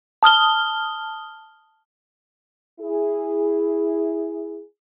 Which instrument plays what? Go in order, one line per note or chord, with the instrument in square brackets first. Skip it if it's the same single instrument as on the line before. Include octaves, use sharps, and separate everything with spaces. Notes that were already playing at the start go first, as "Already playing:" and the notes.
[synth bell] A5 D#6 F6 G7
[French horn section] E4 G#4